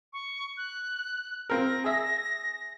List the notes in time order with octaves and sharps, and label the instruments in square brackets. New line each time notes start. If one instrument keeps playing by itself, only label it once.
[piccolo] C#6
F#6
[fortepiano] C4 F4 A#4 [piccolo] A#6
[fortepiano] G#4 E5